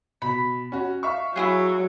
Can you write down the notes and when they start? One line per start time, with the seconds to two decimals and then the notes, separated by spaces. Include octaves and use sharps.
0.22 B2 B5
0.72 C#4 F#4
1.03 E5 F5 C#6
1.36 F#3 E4 F4 G#4